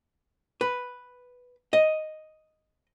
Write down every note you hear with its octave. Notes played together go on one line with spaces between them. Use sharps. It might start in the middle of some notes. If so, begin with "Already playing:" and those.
B4
D#5